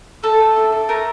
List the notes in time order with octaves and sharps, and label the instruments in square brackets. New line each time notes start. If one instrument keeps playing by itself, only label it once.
[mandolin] A3 A4
A3
D4
A4
A3 A#4